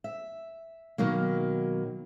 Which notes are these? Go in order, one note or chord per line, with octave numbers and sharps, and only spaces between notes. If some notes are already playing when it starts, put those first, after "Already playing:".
E5
B2 D#3 F#3 A#3